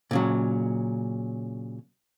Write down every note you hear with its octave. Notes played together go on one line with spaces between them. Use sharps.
A#2 C#3 F#3